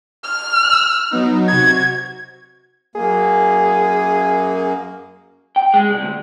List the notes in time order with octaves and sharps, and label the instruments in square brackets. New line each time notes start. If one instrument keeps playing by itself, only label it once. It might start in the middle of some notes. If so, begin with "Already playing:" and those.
[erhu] F6
[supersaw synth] F#3 B3 D#4
[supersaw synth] C3 F#4 [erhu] G#6
[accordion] F#2 A#3 [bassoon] G#4
[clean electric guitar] G5
G#3
C2
D2